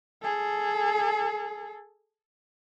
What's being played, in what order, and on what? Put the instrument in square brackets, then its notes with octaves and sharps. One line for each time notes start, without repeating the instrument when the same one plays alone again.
[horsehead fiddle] G#4 A4